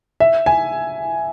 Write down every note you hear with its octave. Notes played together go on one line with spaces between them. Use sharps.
E5
G#5